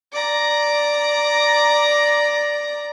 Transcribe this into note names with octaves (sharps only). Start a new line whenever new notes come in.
D5 A#5